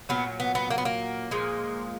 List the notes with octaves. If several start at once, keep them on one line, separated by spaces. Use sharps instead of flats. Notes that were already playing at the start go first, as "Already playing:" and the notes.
A#2 F#3 B3
B3
B3
A#3
B3
A#3
A#2 F3 G#3